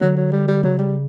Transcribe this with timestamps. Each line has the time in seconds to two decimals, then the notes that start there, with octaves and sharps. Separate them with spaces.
0.01 D3 F#3
0.16 F#3
0.32 G3
0.48 G3
0.63 C#3 F#3
0.78 G3